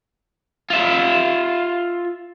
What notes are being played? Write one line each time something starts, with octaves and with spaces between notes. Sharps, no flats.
F4 E5